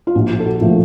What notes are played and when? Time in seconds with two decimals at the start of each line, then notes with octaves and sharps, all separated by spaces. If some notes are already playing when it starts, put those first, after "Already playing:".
0.07 F4
0.15 A#1 F#4
0.40 A4
0.46 F#4
0.61 A#2 F3 A3